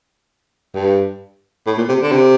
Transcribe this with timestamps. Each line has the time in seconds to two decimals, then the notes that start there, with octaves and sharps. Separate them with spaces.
0.75 G2
1.66 A2
1.77 A#2
1.88 C3
2.02 D3
2.12 C3